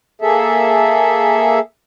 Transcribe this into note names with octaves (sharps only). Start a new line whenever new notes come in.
A#3 G#4 A4 E5